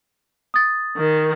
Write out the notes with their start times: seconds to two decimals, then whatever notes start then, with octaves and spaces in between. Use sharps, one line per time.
0.54 D#6 A6
0.97 D#3